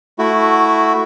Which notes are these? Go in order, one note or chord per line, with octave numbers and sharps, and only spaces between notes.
A3 E4 F#4